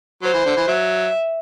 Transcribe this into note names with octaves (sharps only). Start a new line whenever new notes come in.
F#3 C5
E3
D3
E3
F#3 E5